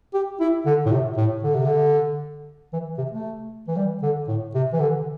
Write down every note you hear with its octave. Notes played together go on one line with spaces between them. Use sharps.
G4
E4
D3
A2
C3
A2
D3
C3
D3
E3
C3
A3
E3
G3
D3
A2
C3
E3
D3